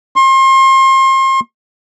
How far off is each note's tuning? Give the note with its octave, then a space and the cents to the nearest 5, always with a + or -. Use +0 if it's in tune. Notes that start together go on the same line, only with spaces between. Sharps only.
C6 +35